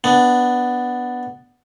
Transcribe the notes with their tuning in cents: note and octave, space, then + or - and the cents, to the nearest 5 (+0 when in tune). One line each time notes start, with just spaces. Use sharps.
B3 +0 D4 +0